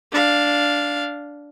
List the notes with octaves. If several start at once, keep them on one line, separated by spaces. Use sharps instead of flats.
D4 F5